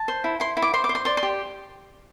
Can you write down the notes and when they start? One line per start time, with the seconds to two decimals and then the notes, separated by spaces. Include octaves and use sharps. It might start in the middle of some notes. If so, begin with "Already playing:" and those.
Already playing: A5
0.08 C5
0.24 E4
0.40 E4 C6
0.57 E4
0.62 D6
0.74 C5 C6
0.84 D6
0.89 C5
0.95 C6
1.05 D5 C6
1.17 C6
1.23 G4